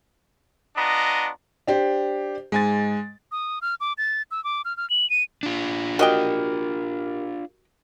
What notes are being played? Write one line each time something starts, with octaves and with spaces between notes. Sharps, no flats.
B3 D4 F4 D#5 A#5
D4 G4 C5
G#2 G#3 G#5 A6
D#6
F6
D6
A6
E6
D6
F6
F6
F#7
D#7
D4 F4
F#4 G4 A#4 D#5 G5